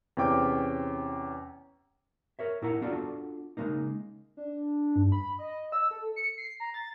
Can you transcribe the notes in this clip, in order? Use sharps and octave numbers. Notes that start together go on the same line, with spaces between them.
E2 C3 C#4 G5 D6
A#4 C#5 E5
A#2 E4 A#4 F#5 A#5
B3 D4 F4 F#4 A4 D5
C#3 F3 G#3 A#3 D#4
D4
G2
B5
D#5
E6
A4
C#7
C7
A#5
A6